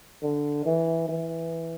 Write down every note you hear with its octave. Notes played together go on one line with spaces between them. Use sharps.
D3
E3
E3